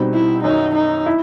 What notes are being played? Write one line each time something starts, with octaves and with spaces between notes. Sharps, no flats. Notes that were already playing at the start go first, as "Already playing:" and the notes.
Already playing: B2 G3 C4 D#4
E4
F#2 D#3 F#3 D#4
D#4
E4